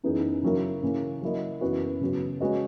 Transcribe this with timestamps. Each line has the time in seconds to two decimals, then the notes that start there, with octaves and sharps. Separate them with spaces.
0.04 F#2 E3 B3 D#4 G#4
0.43 C#3 F#3 A#3 E4 A#4
0.83 C#3 E3 A#3 C#4
1.22 F#3 A#3 E4 A#4 D#5
1.61 F#2 E3 B3 F#4 B4
2.01 C#3 F#3 B3 F#4
2.40 G#3 C#4 F#4 B4 D#5